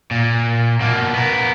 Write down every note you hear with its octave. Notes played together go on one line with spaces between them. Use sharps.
A#2
B2 A#3
B3 A#4